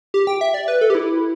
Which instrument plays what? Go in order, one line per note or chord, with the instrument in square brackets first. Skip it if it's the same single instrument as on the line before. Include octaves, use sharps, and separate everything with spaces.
[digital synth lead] G4
G5
E5
D5
B4
A4
G4
E4